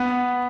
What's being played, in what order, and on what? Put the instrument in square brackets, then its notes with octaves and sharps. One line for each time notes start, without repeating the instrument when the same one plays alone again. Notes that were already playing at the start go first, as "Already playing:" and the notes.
Already playing: [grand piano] B3